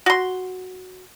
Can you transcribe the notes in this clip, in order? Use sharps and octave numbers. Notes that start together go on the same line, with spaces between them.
F#4 C6